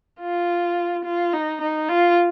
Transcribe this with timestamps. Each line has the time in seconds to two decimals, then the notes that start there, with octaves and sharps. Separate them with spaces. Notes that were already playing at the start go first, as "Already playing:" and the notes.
0.20 F4
1.05 F4
1.33 D#4
1.61 D#4
1.89 F4